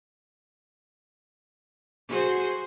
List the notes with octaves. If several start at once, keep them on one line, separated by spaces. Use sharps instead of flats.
F#4 G#4 C5